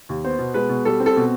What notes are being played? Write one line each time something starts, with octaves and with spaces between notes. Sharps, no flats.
D#2
B3 C5
B2
G#3 B4
B2
G3 A4
C4
A4
B2